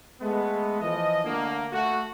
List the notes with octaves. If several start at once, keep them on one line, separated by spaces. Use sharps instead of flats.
G#3 A3 B3
E3 F3 D#5
D3 A3 A#3
A3 F#4